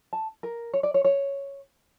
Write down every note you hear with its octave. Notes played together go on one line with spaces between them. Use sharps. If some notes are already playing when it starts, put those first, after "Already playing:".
A5
A#4
C#5
D5
C#5
C#5